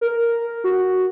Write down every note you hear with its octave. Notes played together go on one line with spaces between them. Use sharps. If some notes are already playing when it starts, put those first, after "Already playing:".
A#4
F#4